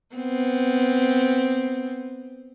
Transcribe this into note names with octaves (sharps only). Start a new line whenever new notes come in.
B3 C4